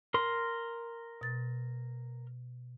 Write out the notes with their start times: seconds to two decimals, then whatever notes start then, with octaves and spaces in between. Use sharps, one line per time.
0.14 A#4 C6
1.21 B2 A6